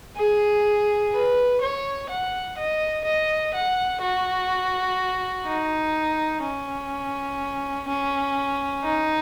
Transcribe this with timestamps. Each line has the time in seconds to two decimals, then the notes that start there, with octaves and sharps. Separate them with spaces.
0.16 G#4
1.12 B4
1.61 C#5
2.09 F#5
2.57 D#5
3.05 D#5
3.54 F#5
4.01 F#4
5.46 D#4
6.43 C#4
7.88 C#4
8.84 D#4